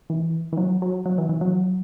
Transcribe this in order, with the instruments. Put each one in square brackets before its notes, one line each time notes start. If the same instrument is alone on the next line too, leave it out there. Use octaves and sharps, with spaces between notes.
[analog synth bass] E3
E3
F#3
F#3
F#3
E3
E3
F#3